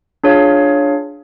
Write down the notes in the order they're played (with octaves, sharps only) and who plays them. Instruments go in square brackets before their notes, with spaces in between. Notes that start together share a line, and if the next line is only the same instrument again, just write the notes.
[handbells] D4 F4 G#4 C#5 F5